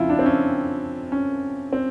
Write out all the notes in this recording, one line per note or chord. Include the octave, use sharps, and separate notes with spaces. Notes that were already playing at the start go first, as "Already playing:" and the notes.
Already playing: F2 C#3 F3 E4 F4
D4
C4
C#4
C#4
C4